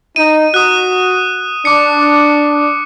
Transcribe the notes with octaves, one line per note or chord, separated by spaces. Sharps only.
D#4 D#7
F#4 D#6 F#6
D4 D6 C#7